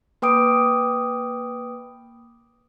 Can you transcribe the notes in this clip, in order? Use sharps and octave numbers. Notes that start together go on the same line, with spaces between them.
A#3 B4 G5 D6 D#6 D7